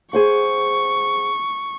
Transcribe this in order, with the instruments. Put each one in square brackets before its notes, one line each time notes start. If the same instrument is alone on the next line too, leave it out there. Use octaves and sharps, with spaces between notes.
[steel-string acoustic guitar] G#4 C5 F#5 [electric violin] C#6